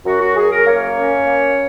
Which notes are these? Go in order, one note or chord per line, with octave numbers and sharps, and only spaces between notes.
F#2 F#4
F#4
F#2 G#4
A#4
A#3 C#5
C#4
A#3